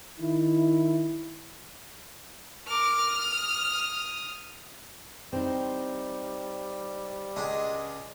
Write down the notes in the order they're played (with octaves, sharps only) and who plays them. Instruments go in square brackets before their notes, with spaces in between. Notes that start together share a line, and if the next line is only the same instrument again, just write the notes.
[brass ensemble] D#3 E4
[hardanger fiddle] A#4 D6 [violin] F6
[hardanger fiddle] D#6
[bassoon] G3 [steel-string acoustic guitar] C4 D#4
[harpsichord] C#2 G#3 D4